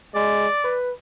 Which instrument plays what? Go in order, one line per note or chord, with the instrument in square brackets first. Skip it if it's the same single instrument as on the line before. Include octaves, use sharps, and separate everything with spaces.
[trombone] G#3 [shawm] D5
[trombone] B4